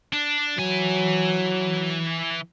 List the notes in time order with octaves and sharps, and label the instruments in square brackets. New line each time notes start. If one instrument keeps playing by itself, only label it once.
[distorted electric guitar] D4
[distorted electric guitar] E3 G#5 [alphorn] F#3